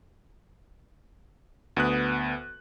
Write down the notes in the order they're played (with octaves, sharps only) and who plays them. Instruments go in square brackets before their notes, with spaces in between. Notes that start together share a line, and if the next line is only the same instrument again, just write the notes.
[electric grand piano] D2 B3 B4 D#6 F#6